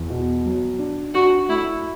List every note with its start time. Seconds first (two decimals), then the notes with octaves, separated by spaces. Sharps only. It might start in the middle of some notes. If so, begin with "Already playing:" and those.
Already playing: E2
0.10 B2
0.46 F#3
0.79 D4
1.14 D4 F#4
1.49 A3 E4